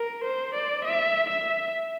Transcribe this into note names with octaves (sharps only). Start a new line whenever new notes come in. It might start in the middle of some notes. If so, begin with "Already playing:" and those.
Already playing: A#4
C5
D5
E5
E5